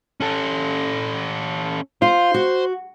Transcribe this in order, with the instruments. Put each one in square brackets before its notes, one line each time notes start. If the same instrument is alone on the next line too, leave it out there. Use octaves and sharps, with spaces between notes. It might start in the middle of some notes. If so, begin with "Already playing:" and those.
[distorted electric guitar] C#4 A4
[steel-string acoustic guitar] F4 [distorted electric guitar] C5
[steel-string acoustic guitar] F#4